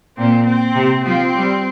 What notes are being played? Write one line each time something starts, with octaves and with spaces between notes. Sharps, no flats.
A#2 C4
C4
C3
F3 C4
G3